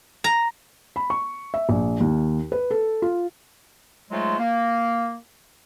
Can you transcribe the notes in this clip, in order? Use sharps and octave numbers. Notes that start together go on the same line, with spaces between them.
A#5
B5
C#6
E5
A#1
D#2
B4
A4
F4
G#2 F#3 G#3 A3 F4
A#3